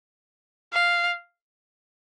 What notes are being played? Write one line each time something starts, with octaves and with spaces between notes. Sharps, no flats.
F5